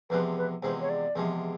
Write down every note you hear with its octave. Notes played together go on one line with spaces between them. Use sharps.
E2 C3 F3 G#3 B4
B4
E2 C3 F3 G#3 C5
C#5
D5
E2 C3 F3 G#3